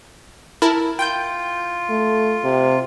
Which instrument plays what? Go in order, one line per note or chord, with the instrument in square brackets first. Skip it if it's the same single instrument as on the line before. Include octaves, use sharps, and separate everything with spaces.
[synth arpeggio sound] E4 A#4 A5
[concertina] F4 [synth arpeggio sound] G5 G6
[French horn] A3
C3